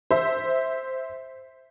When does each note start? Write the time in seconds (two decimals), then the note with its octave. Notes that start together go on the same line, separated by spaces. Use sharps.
0.11 C5 E5